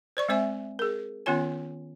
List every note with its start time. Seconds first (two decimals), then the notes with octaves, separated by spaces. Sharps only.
0.17 C5 D5 C#6
0.29 G#3 C4 C5 E5 G#5
0.79 G#4 A#4
1.26 D#3 B3 C#4 F4 C#5 G#5